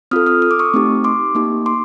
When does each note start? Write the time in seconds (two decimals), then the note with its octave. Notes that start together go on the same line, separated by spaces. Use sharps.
0.11 C4 F4 A4 D#6 F6
0.27 D#6 F6
0.42 D#6
0.51 D6
0.59 C#6 D#6
0.74 A3 C4 D#4 G4
1.04 C6 D6
1.35 A#3 D#4 G4
1.66 C6 D6